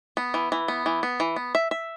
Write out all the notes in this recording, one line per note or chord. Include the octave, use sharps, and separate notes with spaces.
B3
E3
E3
B3
E3
B3
E3
B3
E5
E5